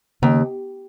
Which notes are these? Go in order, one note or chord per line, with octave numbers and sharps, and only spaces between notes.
D#2 C#3